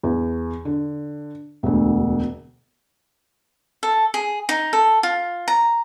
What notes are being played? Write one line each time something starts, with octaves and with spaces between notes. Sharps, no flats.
E2
D3
E1 D2
A4
G#4
D#4
A4
F4
A#5